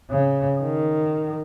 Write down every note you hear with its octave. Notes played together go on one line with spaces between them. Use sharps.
C#3
D#3